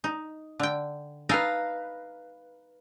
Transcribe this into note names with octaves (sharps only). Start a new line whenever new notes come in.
D#4
D3 G5
D#4 A4 B4 F5 G#5 A#5